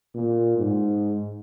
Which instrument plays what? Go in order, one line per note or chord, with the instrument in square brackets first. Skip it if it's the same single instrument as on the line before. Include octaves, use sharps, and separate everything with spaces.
[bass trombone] A#2
G#2